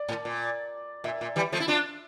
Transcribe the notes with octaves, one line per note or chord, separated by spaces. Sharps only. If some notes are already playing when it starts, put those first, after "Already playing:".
Already playing: D5
A2
A#2
A#2 E5
A#2
E3 G3
F3 A3
E4
D4 F4